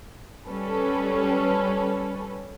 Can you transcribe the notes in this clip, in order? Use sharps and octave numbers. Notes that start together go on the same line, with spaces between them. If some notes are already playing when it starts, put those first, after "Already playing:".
G3 C#4 A4 B4